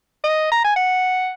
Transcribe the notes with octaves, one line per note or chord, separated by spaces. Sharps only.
D#5
A#5
G#5
F#5